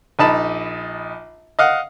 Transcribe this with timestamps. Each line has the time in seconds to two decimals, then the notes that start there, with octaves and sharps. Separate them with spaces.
0.19 A#1 D#4 A5 B5
1.59 D#5 F5 F#5